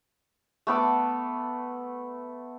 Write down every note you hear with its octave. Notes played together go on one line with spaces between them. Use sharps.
A3 B3 A4 D6